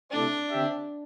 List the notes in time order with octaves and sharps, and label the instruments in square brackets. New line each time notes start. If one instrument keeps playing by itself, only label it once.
[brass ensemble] C3 A3 E4 A4 D5 [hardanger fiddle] D4
[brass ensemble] D3 C4 G4 E5